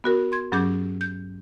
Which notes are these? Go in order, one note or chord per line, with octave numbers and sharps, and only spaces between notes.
B3 F#4 A#4
C6 G#6
G2 F#3 C#4 G#4 D6 G6
G6